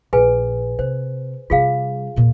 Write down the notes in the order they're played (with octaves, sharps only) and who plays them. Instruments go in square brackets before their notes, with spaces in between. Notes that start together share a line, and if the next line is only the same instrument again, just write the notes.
[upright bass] A#1 [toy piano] G#4 B4 G#5
[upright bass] C3 [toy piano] C5
[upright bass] C3 G3 [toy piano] F4 G#4 F5
[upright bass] D#2 A#2